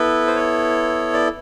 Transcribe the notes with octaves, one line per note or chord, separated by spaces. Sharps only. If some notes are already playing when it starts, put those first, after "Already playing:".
Already playing: B3 E4 A4 B4
C5
C#5
D5